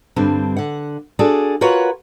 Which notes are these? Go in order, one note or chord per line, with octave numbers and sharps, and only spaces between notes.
G2 D3 G3 C4
D3 F#5
D4 F#4 G#4 A4 D5
F4 F#4 A#4 B4 C#5 F#5